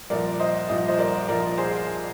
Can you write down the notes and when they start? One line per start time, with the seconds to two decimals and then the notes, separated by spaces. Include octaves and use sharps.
0.10 C2 A#2 F3 A#4 D5
0.39 C5 D#5
0.69 C2 A#2 F3 D#5
0.88 C5 D#5
0.99 A#4 D5
1.28 C2 A#2 F3 A#4 D5
1.58 G#4 C5